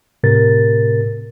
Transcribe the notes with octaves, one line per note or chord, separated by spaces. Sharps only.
A2 C3 A#4 A6